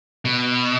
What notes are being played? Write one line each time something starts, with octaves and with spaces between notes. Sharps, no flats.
B2